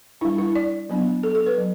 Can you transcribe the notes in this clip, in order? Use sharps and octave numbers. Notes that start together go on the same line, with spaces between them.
G3 D4 E4
E4
D5
F#3 B3 D4
A4
A4
B4
F#3